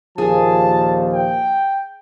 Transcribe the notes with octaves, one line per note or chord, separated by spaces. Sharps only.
D#2 A#2 F3 G#4 A5
G5